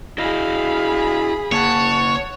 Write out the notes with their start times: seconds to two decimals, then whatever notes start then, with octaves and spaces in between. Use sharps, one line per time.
0.18 E4 F#4 G#4 D#5 F5 B5
1.52 C#3 A#3 C#5 F#5 A5